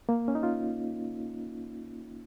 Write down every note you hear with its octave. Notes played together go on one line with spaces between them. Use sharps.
A#3
C#4
D#4
F4